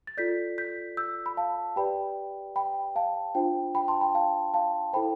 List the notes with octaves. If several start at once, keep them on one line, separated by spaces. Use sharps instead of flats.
A6
F4 A4 D5 G6 B6
G6 B6
E6 G6
B5
F5 A5
G4 B4 D5 G5 B5
G5 B5
F5 A5
D4 F4 C5 G5
G5 B5
A5 C6
G5 B5
F5 A5
F5 A5
E4 A4 C5 G5 B5